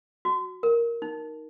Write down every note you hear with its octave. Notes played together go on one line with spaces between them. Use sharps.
F#4
A#4
D#4